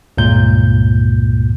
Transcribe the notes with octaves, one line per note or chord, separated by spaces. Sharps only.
C#2 G2 A#2 G6